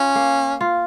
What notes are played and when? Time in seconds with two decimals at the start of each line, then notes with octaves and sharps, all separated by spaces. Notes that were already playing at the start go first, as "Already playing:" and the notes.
Already playing: C#4 F4
0.15 A#3
0.61 F4